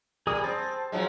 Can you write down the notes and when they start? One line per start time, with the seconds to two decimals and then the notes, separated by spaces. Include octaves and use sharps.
0.27 G3 G#4 A#4 D#6
0.44 C4 A5
0.92 F3 F#3 G#3